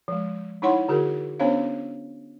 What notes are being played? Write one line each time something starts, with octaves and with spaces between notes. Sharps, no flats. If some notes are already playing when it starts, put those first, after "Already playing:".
F3 G#3
D#4 E4 C#5 F#5 B5 C6
D3 F#4 G#4 A#4
B3 C#4 D4 C5 C#5 F5